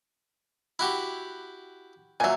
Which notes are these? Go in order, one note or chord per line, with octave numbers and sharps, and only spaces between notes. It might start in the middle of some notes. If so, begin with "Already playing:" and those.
E4 F#4 G4
A#2 F#3 E5 G#5